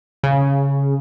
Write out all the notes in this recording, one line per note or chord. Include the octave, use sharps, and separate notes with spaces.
C#3